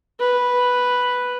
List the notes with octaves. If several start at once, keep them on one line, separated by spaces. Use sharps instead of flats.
B4